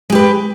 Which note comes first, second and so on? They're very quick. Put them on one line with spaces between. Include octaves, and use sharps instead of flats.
G#3 G4 B4